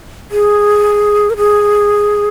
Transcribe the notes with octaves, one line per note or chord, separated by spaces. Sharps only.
G#4
A#4
G#4